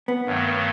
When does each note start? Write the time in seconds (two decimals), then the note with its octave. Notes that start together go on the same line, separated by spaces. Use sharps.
0.08 B3
0.25 G2 D#3 F#3 A3